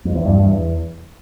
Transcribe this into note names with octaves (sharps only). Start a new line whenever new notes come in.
F2
E2
G2
G2
E2